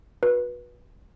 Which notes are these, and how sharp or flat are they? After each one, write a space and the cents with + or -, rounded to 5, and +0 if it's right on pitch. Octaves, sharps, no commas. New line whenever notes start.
F#4 -30 B4 -20